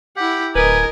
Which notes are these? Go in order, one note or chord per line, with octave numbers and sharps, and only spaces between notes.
E4 G4 F#5
D1 A#4 B4 D#5 G#5